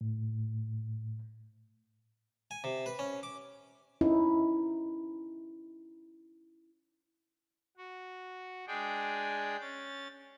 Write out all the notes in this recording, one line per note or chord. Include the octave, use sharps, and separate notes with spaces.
A2
G#5
C3
B4
C#4
D6
C#4 D#4 E4
F#4
G#3 D4 G#4 G5
C#4 A6